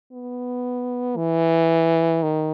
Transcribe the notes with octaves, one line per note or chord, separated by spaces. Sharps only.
B3
E3
D#3